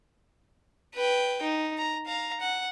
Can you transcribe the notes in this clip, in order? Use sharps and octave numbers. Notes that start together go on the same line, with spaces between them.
B4 G5
D#4
A#5
F5 A#5
F#5